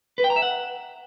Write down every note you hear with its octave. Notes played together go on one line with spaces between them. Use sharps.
B4
G5
A#5
E5
F#5